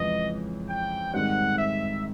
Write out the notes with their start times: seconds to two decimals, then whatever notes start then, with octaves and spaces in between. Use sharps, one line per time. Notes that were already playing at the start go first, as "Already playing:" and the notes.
Already playing: F2 C#3 E3 G#3 D#5
0.69 G5
1.13 G#2 D#3 G3 C4 D#4 F#5
1.57 E5